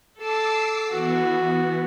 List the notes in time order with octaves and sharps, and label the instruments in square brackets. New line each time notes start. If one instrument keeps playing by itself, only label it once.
[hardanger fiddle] A4 A5 [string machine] D6 E6 C7
[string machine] E3 B3 [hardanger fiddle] F#4